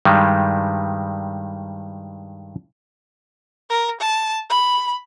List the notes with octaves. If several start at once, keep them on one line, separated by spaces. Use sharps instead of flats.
G2 D#3 G3 G#3
A#4
A5
B5